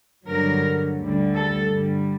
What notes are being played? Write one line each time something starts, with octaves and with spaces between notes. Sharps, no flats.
G2 D3 F#3 A#4
D2 D3 G3
A4
G2 D3 G3